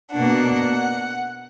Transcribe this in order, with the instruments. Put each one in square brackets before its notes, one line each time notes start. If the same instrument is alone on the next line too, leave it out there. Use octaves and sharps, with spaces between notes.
[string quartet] B2 A#3 D4 F#5